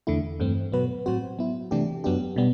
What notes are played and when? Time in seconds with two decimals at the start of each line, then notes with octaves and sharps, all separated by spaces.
0.07 E2 D3 A3 E4
0.40 G2 E3 A3 C4
0.72 B2 F#3 B3 F#4 B4
1.06 A2 F#3 C4 F#4 C5
1.39 F#3 B3 E4
1.71 C3 E3 A3 D4 G4
2.04 F#2 F#3 B3 D4 G4
2.36 B2 G3 B3